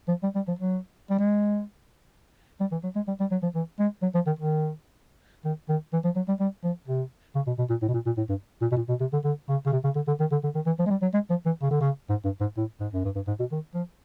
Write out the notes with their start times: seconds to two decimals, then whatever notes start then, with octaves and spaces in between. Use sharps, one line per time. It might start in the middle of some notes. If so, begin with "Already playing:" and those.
0.08 F3
0.23 G3
0.35 G3
0.48 F3
0.59 F#3
1.10 G3
1.19 G#3
2.61 G3
2.72 E3
2.84 F#3
2.96 G#3
3.08 G3
3.20 G3
3.32 F#3
3.43 F3
3.55 E3
3.80 G#3
4.02 F#3
4.15 F3
4.27 D#3
4.39 D#3
5.45 D#3
5.69 D#3
5.93 E3
6.04 F3
6.16 F#3
6.28 G3
6.40 G3
6.64 F3
6.88 C3
7.36 C#3
7.47 B2
7.59 B2
7.70 A#2
7.82 A2
7.89 B2
7.94 A#2
8.06 A#2
8.18 A2
8.29 G2
8.62 A#2
8.72 B2
8.77 A#2
8.89 B2
9.01 C3
9.13 D3
9.25 D3
9.49 C#3
9.66 C#3
9.73 C3
9.84 C#3
9.96 D3
10.08 D3
10.20 D#3
10.32 D3
10.44 D3
10.55 D#3
10.66 E3
10.79 F3
10.86 G#3
10.91 G3
11.02 F#3
11.14 G#3
11.30 F3
11.46 E3
11.62 C#3
11.71 D3
11.81 C#3
12.10 G#2
12.25 G2
12.41 G#2
12.57 A2
12.80 G#2
12.93 F#2
13.05 G2
13.16 G2
13.28 G#2
13.40 B2
13.52 D#3
13.75 F3